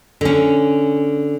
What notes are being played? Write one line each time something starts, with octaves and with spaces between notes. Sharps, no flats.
D3 C#4